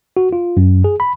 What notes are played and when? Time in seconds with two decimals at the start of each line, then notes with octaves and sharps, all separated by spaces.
0.17 F#4
0.33 F4
0.57 F#2
0.84 G#4
1.00 B5